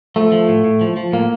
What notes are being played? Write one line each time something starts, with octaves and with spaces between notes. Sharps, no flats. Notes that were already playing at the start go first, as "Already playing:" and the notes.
F3 A3
F3
A2
A2
F3
F3
A2 A#3